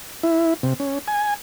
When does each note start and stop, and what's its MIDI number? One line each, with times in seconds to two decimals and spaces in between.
0.23 0.54 64
0.63 0.74 48
0.80 0.99 61
1.08 1.34 80